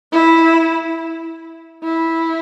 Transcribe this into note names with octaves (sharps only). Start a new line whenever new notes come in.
E4
E4